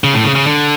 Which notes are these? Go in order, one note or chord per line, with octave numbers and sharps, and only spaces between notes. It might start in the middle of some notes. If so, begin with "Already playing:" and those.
C#3
A2
C#3
C#3
D3